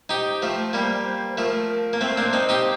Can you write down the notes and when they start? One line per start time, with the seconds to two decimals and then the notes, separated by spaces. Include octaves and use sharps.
0.09 D#4 G4 C5
0.42 F3 A3
0.73 G3 A#3
1.31 C5
1.37 F3 A3 A#4
1.93 A#3
2.01 A3 C4 C5
2.18 A#3 D4
2.33 C4 D#4
2.49 D#4 G4